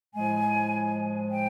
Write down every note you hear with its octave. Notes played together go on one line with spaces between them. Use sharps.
A2 F3 G#3 G#5
G5